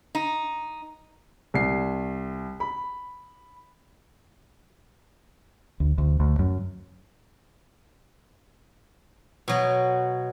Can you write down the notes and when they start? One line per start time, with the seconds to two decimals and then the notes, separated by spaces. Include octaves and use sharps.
0.15 D#4
1.54 C2 C7
2.60 B5
5.80 D2
5.98 D2
6.20 D2
6.39 F#2
9.48 B2 F#3